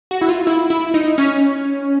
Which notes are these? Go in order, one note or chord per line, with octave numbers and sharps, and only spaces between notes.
F#4
E4
F4
E4
E4
D#4
C#4